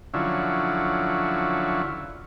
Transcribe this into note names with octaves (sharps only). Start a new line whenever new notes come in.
D3 F3 F#3 C#4 E4